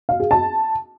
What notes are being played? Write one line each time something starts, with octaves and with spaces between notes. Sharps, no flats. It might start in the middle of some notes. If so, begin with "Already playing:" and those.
F5
G#4
A5